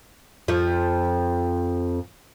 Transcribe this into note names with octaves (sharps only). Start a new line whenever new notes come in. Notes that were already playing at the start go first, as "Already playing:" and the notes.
F2 F3